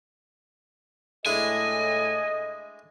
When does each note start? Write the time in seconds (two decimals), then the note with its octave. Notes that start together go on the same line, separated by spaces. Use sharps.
1.26 A2 G#3 D4 E4 A4 D#5 G#5